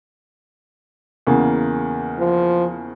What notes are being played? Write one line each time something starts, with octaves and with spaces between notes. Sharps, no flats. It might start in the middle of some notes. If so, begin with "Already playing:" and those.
E2 C#3 A#3
F3